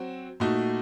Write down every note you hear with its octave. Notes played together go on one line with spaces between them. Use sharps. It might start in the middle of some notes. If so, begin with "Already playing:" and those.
Already playing: F#3 C4 F#4
A#2 A3 D#4 F#4